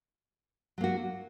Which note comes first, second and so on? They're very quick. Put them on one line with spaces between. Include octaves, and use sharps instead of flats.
F#3 A#3 F#4